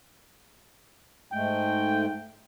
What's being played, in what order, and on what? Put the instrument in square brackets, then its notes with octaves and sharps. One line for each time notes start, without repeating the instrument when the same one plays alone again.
[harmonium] G#2 G#3 A3 [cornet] G5